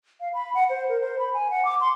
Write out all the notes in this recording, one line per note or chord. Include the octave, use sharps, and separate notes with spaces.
F5
B5
F#5
C5
A#4
C5
B5
G#5
F#5
D6
C6